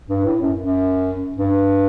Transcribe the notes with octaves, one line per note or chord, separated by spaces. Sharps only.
G2
A2
F#2
F#2
G2